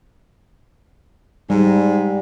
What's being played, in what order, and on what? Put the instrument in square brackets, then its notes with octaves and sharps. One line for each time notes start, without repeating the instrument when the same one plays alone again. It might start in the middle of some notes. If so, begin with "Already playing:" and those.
[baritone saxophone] G#2 [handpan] G3